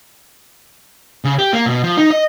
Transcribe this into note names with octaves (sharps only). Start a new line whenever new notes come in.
C#3
G4
A#3
B2
F3
D#4
D#5